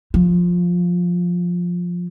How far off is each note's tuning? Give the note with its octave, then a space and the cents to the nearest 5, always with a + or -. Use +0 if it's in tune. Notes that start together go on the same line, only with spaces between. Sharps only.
F3 +10